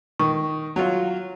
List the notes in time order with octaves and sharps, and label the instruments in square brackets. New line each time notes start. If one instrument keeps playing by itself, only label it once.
[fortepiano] D#3 [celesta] C#6
[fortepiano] F#3 F4